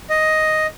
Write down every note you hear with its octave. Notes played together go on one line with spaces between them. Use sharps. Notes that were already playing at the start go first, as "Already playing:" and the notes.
D#5